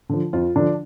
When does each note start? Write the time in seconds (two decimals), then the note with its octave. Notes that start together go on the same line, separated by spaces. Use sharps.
0.09 D3 F3
0.33 F2 F4
0.56 D3 F3 D4